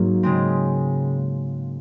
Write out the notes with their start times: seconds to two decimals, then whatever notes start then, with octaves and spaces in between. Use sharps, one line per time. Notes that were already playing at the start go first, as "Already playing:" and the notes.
Already playing: G#2 F#3 A#3
0.23 C#3 G#3 C4